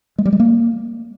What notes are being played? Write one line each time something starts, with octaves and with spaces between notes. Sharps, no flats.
G#3
G3
G#3
A#3